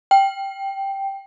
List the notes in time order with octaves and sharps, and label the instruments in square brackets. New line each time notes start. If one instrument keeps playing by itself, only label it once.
[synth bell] G5